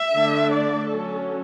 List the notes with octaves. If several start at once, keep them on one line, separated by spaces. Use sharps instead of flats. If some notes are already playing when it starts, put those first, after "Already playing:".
Already playing: E5
D3 A3 D4
D5
F#3 C#4 A4